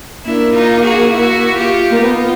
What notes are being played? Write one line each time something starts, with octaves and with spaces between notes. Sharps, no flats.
A#3 D4 E4
D#4 F4
F#4 G#4
E4 F#4
F4 G4
A#3
B3 D#4 F4